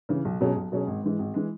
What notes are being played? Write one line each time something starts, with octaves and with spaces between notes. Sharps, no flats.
C#3 E3
B1
B2 F#3 C#4 G#4
B1
B2 F#3 C#4 G#4
G#1
G#2 E3 G#3
G#1
E3 G#3